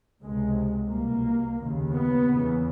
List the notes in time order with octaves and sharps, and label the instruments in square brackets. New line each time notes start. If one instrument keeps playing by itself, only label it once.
[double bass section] C#2 C3 G#3
C2 B2 A#3
D#2 C#3
B3
E2 C#3